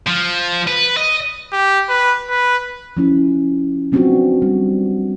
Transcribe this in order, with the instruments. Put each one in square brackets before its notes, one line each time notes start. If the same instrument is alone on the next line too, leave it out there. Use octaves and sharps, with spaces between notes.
[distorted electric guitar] F3
B4
D#5
[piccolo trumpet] G4
B4
B4
[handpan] F3 C#4 E4
F#3 B3 C4 D4 F4 F#4
G3